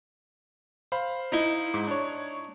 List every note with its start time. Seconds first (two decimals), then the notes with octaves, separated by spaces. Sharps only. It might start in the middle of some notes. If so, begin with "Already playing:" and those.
0.92 C5 F5 B5
1.32 D#4 E4
1.74 G#2 D6
1.87 D4 C#5